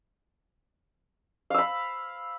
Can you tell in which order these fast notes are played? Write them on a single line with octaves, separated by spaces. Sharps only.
F5 E6 B5